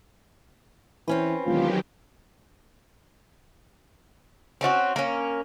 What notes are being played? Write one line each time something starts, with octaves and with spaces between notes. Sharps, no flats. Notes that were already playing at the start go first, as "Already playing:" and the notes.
E3 C4 C#4 B4
E1 D#3 F#3 F4 G4
C4 C#4 F4 F#4
A#3 C#4